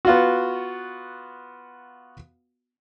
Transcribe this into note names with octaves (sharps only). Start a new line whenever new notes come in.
B3 F4 F#4